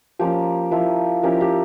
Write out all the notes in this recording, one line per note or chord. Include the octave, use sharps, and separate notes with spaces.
F3 A#3 C#4 G4
F3 A#3 E4
F3 C#4 E4 G4 A#4
G4